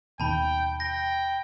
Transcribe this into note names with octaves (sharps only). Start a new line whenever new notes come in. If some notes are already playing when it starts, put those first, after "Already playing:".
D#2 B2 D#3 G5 A5 B5
G5 A#6